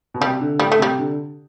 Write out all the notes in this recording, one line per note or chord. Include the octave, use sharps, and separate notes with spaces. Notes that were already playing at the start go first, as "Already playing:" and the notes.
B2
C3 G3
D3
A2 G3
A3
C3 G3
D3